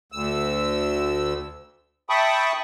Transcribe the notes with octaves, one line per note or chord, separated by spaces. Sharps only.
D2 E6
E5 G5 A5 B5 C#6 D#6